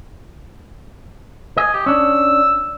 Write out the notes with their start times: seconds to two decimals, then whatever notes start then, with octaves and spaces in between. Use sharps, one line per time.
1.58 D#5 G#5
1.73 G4
1.86 C#4 D4 E6